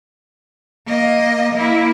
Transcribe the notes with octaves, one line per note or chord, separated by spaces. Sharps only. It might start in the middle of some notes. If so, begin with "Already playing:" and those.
A#3 D#5
A#3 E4